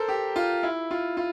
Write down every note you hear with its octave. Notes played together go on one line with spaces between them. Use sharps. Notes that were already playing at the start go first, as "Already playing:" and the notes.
Already playing: A4 A#4 C5
G4
F4
E4
F4
F4